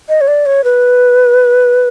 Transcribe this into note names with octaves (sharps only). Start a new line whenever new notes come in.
D#5
C#5
D5
C#5
B4